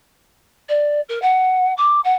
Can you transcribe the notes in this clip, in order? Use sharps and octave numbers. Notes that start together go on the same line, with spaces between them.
D5
A#4
F#5
D6
F#5